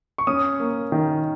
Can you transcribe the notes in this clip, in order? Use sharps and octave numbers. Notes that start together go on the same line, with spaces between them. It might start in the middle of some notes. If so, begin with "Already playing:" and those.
C#6
C#4 D#6
A#3
D#3